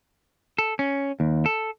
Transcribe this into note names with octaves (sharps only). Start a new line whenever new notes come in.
A4
C#4
D#2
A4